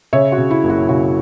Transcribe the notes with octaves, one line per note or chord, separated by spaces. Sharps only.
C#3 C#5 E5
F#4
C#3
E4
F#1
F#4
C#3 F#4